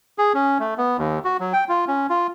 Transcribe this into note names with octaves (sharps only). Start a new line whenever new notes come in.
G#4
C#4
A3
B3
D#2
F#4
F#3
G5
F4
C#4
F4